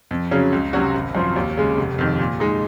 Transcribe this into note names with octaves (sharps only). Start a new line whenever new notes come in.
F2
C#3 F#3 C#4
C#2
C3 F#3 C#4 F#4
G#1
F#2 F3 C4
D#2
C#3 G#3
F1
F2 D#3
A#2
G#3 D#4